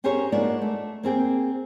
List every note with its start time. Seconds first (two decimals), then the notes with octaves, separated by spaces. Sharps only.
0.04 C#4 G4 G#4 A#4 C5 C#5
0.32 A#3 B3 D4 D#4 F4 D5
0.62 A3
1.03 A#3 C4 G#4 G5